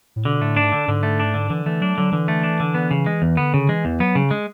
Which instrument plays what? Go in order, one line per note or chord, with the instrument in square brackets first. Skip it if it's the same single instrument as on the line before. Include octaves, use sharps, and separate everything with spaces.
[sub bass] A2
[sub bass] B2 [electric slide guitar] D3
[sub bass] A2 [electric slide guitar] A3
[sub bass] G#2 [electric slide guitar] D4
[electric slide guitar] D3
[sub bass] G#2 [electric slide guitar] D3
[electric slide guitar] A3
D4
D3
[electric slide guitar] D3 [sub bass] E3
[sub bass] E3 [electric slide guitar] A3
[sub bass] F#3 [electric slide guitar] D4
[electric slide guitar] D3 [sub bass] F#3
[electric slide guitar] D3 [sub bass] E3
[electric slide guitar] A3
D4
D3
B3
C#3
G#3
E2
[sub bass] D3 [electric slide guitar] B3
[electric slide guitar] C#3
[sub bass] E3 [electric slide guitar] G#3
[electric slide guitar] E2
[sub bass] F#3 [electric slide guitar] B3
[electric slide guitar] C#3
G#3